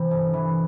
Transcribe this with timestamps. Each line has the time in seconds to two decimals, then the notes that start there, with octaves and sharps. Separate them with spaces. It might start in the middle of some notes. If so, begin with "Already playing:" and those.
Already playing: C3 E3
0.11 G1
0.34 E3